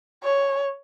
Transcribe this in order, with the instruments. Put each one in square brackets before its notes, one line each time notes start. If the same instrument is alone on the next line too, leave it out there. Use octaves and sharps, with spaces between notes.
[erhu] C#5